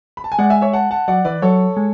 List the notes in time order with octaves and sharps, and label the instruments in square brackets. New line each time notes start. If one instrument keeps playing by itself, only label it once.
[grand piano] B5
A5
G#5
[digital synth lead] G#3 [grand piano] D5 F#5
[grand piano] E5 G#5
C#5 E5
F#5 A5
F#5 A5
[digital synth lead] F#3 [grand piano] D5 F#5
[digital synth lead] E3 [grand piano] B4 D5
[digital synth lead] F#3 [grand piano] A4 C#5
[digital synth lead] G#3